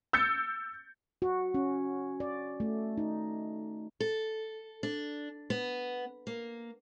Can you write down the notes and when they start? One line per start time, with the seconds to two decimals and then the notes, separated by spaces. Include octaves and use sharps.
0.13 E6 G6 A6 C#7
1.22 F#4
1.54 C#4
2.20 D5
2.60 A3
2.98 D#4
4.00 A4
4.83 D4
5.50 B3
6.27 A#3